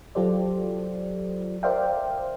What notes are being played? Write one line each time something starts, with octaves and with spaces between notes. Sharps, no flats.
F#3 F4 G4 A4 C5 D5
A#4 C5 D5 E5 F5 G5